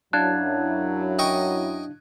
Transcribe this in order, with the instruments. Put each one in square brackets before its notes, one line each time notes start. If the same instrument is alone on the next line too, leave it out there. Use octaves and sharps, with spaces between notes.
[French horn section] F#2 F#3 E4 [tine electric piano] D4 F5 A5 [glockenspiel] F#6 G#6
[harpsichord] D#5 G5 C#6